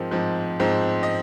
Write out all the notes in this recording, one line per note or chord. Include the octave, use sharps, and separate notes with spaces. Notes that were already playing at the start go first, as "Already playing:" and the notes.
Already playing: G#2 F3 C4 A#4
G#2 F3 C4
G#2 F3 C4
D#5